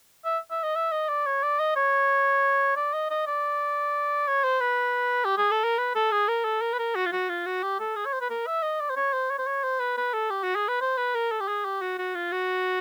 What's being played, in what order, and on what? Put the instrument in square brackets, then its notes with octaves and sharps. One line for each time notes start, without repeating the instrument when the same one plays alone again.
[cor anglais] E5
E5
D#5
E5
D#5
D5
C#5
D5
D#5
C#5
D5
D#5
D#5
D5
C#5
C5
B4
G4
G#4
A4
A#4
B4
A4
G#4
A#4
A4
A#4
B4
A#4
F#4
F4
F#4
F4
F#4
G4
A4
G#4
C#5
C5
B4
A#4
E5
D#5
D5
C5
C#5
C5
C#5
C5
C#5
C5
B4
B4
A4
G4
F#4
G#4
B4
C5
B4
A#4
A4
G4
G#4
G4
F#4
F#4
F4
F#4